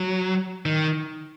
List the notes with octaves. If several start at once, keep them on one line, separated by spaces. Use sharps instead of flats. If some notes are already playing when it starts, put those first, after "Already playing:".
Already playing: F#3
D#3